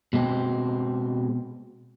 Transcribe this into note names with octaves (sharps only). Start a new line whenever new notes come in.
B2 G#3 C4